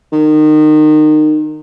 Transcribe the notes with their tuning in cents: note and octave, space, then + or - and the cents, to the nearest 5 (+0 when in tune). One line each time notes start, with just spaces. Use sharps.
D#3 -25